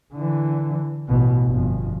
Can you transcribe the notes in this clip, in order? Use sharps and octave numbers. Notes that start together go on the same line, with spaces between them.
D3 E3
A1 B2
G1 F2